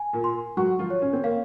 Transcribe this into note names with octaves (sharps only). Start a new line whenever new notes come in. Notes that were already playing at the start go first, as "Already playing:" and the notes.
Already playing: G#5
A#2 A#3
C6
F#3 F#4 C#6
F3 F4
C#5
C#4
C4
A#3 F5